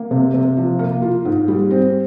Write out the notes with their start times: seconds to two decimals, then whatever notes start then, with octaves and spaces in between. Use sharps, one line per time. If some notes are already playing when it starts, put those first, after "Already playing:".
Already playing: A#3
0.11 C3
0.34 C3
0.57 F3
0.79 A#3
1.02 F4
1.25 G#2
1.48 G3
1.71 C4